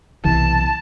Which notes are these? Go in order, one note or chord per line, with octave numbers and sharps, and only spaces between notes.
B1 C3 E3 A5